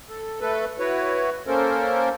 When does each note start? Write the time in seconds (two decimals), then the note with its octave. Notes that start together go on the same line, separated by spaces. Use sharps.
0.09 A4
0.41 A3 A4 B4
0.79 E4 F#4 B4 C#5
1.47 A#3 C#4 A4 A#4 C5